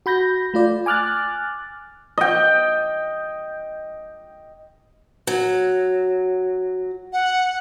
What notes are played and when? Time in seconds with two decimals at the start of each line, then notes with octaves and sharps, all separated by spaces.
0.06 F#4 B5 G6 A#6
0.54 A3 F4 D5
0.86 G#5 D6 F6 F#6 A6
2.18 D#5 G5
5.27 F#3
7.13 F#5